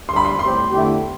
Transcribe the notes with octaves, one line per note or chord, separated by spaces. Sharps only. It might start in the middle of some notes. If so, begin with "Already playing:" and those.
D3 G3 D4 G4 C6
B5
C6
A2 G3 C4 G4 C6
D3 A3 E4 G4